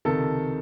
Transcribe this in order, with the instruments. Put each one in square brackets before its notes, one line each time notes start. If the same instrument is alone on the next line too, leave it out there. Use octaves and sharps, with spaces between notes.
[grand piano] C#2 C3 D#3 A4 A5